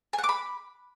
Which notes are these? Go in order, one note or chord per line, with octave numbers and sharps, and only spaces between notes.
G#5
F#5
D6
B5